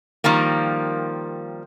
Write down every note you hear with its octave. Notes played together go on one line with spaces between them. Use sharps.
D#3 F3 G3 A#3